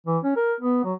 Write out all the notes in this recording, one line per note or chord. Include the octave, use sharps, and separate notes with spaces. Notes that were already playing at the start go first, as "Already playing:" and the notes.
E3
C#4
A#4
B3
F#3